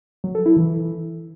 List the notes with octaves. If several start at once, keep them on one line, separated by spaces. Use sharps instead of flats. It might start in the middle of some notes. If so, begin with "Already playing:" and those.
F#3
A4
E4
E3